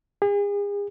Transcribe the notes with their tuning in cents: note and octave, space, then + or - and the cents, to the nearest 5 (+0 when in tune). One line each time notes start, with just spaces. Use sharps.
G#4 -40